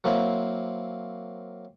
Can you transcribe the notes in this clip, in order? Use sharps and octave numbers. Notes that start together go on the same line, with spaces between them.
F#3 A#3 C4 E4